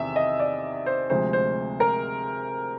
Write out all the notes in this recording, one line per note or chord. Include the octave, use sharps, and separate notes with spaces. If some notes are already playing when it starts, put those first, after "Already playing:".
Already playing: E2 C3 D#3 E5
D#5
D5
C5
D2 C3 F3 G#3 C5
C5
A#4